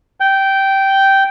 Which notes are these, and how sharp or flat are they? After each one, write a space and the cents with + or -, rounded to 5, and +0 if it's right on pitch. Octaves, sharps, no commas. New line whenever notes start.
G5 -10